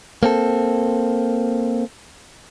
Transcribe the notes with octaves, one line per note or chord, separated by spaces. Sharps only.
A#3 C4 A4